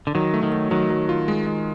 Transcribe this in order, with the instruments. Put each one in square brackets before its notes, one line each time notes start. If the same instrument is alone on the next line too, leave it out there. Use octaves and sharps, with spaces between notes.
[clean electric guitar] D3
[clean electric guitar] D#3 [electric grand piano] F#3
[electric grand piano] A3
[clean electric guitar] D#3
[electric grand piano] A3
[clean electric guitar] D#3 [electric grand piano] F#3
[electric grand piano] F#3
F4
G#3
G#3